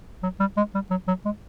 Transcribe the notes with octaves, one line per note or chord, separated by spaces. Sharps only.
F#3
G3
G#3
G3
F#3
F#3
G#3